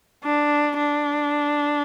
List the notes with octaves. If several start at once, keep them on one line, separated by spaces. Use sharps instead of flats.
D4
D4